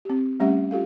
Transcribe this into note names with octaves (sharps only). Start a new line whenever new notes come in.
C4 G4
G3 A3 C#4 G4 E5 F#5
F4 G4 A4 F5